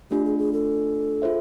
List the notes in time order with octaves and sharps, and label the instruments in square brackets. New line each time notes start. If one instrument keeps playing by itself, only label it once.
[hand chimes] A3 D4 F4 [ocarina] G4
[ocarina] G#4
G#4
A4
[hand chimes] F4 G#4 C5 E5